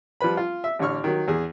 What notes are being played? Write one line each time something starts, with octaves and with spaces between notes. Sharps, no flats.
F3 G3 B4 B5
F4
E5
A1 D3 C#5 C#6 F6
D#3 F#3
E2 G#4